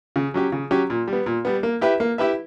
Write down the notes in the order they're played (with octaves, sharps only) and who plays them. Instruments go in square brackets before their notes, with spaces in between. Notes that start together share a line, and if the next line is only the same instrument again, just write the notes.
[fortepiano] C#3
F#3 C#4 G4
C#3
F#3 C#4 G4
A#2
G3
B3
A#2
G3 B3
A#3
E4 G4 B4 E5
A#3
E4 G4 B4 E5